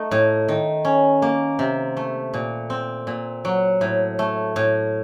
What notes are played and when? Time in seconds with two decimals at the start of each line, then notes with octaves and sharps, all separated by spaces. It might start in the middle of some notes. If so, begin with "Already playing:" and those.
Already playing: A3 D#4
0.11 A2
0.48 D#3
0.85 C#4
1.22 A#3
1.59 C3
1.97 A3
2.34 A#2
2.70 C4
3.07 A#2
3.45 F#3
3.81 A2
4.19 A3
4.56 A2